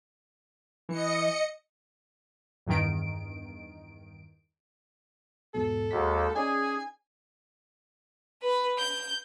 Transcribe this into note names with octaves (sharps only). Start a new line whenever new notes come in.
E3 D#5 C#7
E2 G2 D#3 D7
E2 G#2 B2 A4
D#2 G#3 F#4 B6
C#4 D#4 G#4 D5 G#5
B4
G6